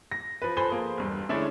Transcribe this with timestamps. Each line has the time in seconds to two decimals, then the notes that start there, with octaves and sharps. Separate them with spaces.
0.12 A#6
0.42 F3 B4
0.57 F3 A4 C5 G#5 B5 G7
0.68 A#3 G#4 C5
0.98 E1 G2
1.29 D3 G#3 A3 C#4 D4 E4